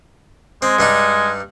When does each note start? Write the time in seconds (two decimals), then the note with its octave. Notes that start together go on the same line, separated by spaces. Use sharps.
0.62 G#3 C4
0.79 G2 D4 D#4